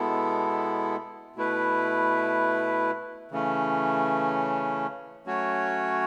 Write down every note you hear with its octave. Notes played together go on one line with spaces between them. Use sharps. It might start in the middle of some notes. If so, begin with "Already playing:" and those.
Already playing: B2 G#3 B3 E4 A4
B2 A3 E4 B4
C#3 E3 A3 C#4
F#3 A3 C#4 F#4 C#5